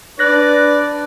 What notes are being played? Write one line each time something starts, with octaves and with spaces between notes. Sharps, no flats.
D4 B4 D5 F#6 A#6